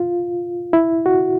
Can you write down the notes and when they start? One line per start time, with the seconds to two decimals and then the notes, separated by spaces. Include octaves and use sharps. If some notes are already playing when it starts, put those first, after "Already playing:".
Already playing: F4
0.73 E4
1.06 F#4